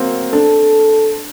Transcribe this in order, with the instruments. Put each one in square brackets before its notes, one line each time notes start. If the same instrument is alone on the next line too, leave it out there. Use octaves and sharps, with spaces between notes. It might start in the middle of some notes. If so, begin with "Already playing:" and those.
Already playing: [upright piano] F#3 A#3 C4
[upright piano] D4 [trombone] A4